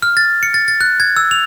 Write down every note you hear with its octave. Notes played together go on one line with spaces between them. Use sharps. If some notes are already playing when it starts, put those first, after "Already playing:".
F6
A6
C#7
A6
A6
F#6
G#6
E6
F7